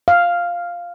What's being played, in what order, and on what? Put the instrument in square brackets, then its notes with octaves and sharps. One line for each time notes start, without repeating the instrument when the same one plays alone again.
[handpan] F5